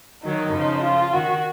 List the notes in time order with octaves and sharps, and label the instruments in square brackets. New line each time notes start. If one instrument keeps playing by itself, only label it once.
[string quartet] D#3 F#3 [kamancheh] D#4
[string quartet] C#3 F3
[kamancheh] F4
[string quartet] D#3 [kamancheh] F#4